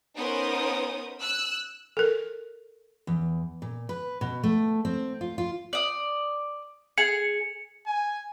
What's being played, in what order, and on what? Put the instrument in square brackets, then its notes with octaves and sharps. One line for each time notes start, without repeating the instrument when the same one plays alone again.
[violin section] B3 C#4 D#4 A#4 C5 D#6
E6 F#6
[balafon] A4 A#4
[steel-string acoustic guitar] E2
A#2
B4
B2
A3
C4
F4
F4
[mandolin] D5 D#6
[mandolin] G#4 [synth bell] C#7
[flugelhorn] G#5